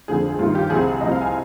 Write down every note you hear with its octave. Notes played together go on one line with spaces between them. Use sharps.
F2 D3 F3 G#4
G#4
G2 D#3 F4
G4
C2 C3 F3 G#4
C2 C3 F3 D#5
F5
G#5